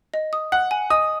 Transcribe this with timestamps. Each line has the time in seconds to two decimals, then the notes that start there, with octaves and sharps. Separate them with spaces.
0.14 D#5
0.33 D#6
0.52 F#5 F#6
0.71 G#5
0.90 D#5 D#6